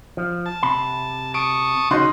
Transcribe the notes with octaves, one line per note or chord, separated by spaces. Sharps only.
F3
A5
C3 B5
A5 C#6 D#6 D7
C#3 D#4 F#4 D#5 C6